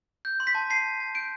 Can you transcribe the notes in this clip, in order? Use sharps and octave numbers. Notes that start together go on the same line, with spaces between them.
G6
C6
B6
A5
A5 C7
A5
A5
G6 D7